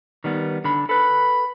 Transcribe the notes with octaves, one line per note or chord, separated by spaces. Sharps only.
D#3 G3 B3
D3 B5
A4 B4 B5